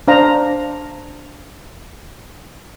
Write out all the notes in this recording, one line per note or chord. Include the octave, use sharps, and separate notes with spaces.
D4 C5 F5 A#5